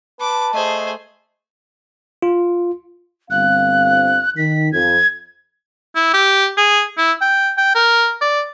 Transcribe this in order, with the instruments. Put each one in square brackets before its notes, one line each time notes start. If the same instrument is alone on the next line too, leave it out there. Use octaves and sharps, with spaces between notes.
[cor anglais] B4 [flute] A5 [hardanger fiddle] D6
[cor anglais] A3 [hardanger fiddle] G#4 C5 [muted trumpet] D#5
[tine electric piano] F4
[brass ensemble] G1 C4 F5 [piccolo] F#6
[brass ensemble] D#3 [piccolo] B6
[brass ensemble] F2 [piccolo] G#6
[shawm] E4
G4
G#4
E4
G5
G5
A#4
D5